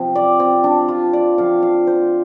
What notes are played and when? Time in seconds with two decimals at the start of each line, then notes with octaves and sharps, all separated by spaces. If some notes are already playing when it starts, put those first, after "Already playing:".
Already playing: C3 F3 C4
0.15 D5
0.40 C4
0.64 D4
0.88 F4
1.13 D5
1.38 D3 F3 C4 F5
1.63 F5
1.87 C5